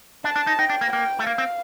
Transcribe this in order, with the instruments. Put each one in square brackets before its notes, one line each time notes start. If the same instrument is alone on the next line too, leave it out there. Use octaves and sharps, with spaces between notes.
[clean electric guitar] D4 [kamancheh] A5
[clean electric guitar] D4
D#4
[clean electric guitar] D#4 [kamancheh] G5
[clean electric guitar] D4
A#3
[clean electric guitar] A#3 [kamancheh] G5
[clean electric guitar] A3
[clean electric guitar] A#3 [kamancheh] F5
[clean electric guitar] C4